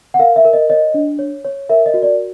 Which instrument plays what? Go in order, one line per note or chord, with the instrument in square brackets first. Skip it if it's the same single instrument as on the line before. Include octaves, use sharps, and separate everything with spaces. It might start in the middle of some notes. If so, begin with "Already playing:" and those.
[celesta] F#5
A#4 F5
E5
A#4
D#5
C#5 D#5
D4
C#5
C#5
A#4 E5
D#5
F#4
D5